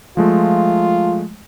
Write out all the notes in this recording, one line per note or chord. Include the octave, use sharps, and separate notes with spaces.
F3 G#3 A3 F4